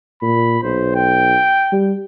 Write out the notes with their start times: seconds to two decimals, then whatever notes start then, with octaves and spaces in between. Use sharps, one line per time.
0.22 A#2 B5
0.63 B1 C5
0.96 G5
1.72 G3